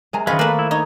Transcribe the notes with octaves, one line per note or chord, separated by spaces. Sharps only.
C3 G#3 A#4 G#5 A#5
D#3 G#3 C4 C#4 B4 F5 D#6 A6
A3 A#3 B4
E4
D#4 C#5 A#5